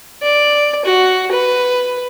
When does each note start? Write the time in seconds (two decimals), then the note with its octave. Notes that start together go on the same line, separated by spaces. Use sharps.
0.22 D5
0.85 F#4
1.31 B4